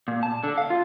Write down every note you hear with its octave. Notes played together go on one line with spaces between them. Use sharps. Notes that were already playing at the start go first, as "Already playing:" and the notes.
A#2
A5
D3
F5
F4